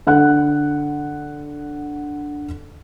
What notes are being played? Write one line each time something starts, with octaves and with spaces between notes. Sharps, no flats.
D3 F#5 F#6